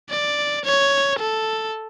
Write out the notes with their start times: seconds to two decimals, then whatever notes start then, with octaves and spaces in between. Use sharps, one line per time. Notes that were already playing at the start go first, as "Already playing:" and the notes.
0.10 D5
0.64 C#5
1.19 A4